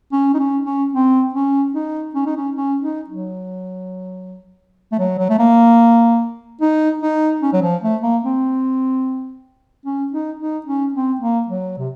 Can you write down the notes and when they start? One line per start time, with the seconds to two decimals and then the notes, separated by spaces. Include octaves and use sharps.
0.13 C#4
0.34 D#4
0.39 C#4
0.66 C#4
0.93 C4
1.34 C#4
1.74 D#4
2.15 C#4
2.26 D#4
2.37 C#4
2.56 C#4
2.82 D#4
3.10 F#3
4.92 A3
4.99 F#3
5.19 F#3
5.30 A3
5.39 A#3
6.61 D#4
7.02 D#4
7.43 C#4
7.53 F#3
7.63 F3
7.83 A3
8.03 A#3
8.24 C4
9.86 C#4
10.13 D#4
10.40 D#4
10.66 C#4
10.94 C4
11.21 A#3
11.48 F#3
11.78 C3